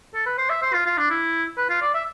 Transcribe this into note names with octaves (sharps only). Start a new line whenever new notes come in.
A4
B4
C5
E5
C5
F4
F4
D4
E4
B4
F4
D5
E5